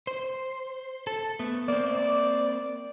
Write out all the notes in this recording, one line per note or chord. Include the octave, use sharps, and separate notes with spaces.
C5
A4
A3 B3
A#3 C4 D5